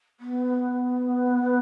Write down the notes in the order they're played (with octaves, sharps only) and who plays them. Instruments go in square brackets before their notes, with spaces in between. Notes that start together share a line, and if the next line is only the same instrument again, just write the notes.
[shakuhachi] B3